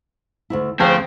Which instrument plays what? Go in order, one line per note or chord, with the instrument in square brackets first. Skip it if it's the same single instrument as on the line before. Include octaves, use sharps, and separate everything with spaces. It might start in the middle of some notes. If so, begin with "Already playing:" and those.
[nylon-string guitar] D2 G#2 E4
[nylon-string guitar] D2 F3 A5 [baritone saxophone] C#3 [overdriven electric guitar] C4